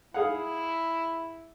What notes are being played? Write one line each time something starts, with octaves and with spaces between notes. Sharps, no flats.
E4 G#4 F5 F#5